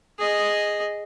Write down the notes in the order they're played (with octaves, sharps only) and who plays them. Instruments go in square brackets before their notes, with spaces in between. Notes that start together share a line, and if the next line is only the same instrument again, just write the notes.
[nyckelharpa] G#4 D#5